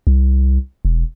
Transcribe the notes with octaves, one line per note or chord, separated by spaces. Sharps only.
C2
E1